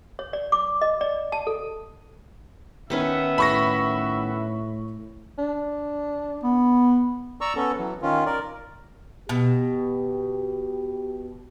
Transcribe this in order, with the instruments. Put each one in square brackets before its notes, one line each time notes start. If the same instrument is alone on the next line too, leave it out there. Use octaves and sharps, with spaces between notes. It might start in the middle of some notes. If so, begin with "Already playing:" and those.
[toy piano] C#5
D5
D6
D#5
D5
A5
A4
[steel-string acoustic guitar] D#3 B3 C#4 [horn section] B4 E5
[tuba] A2 [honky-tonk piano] B5 C#6 A#6
[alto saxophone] D4
[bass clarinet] B3
[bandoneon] D5 A#5 C#6 E6
B3 C#4 A4
E3 F#3
D#3 C#4 F4
A#4 D5
[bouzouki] B2 [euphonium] G4